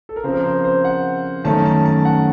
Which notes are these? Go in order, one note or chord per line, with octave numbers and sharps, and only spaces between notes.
A4
A#4
C#3 F3 C4 C5
A#4
C5
C5
F#5
F#2 D#3 A3 C#4 A5
A5
A5
F#5